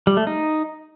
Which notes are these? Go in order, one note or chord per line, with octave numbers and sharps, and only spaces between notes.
G3
A3
D#4